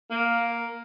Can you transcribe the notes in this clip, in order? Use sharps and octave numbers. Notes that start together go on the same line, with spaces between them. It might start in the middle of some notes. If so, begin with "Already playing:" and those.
A#3